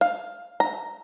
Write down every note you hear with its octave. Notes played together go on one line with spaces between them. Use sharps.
F5
A#5